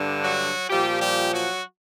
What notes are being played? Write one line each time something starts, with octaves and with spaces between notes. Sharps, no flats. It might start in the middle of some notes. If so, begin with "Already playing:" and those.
Already playing: G2 D3
F#3 F#4
A#2 F3 G3 G4
G3 G4
F#3 F#4